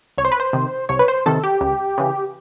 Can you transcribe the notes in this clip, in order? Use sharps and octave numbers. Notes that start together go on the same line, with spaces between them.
C2 C#5
C5
B4
C5
C3 D#3
C2 C#5
B4
C5
C3 D#3 A4
G4
C#2
C#3 E3